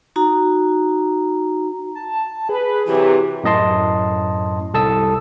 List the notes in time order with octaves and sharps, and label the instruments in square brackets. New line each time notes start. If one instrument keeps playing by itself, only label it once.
[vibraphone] D#4 F#4 A#5
[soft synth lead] A5
[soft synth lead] G#4 [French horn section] B4
[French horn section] C3 E3 F#3 [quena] G4
[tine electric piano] F#2 A2 D#5 A5 C6
C2 A4 A5 D#6 E6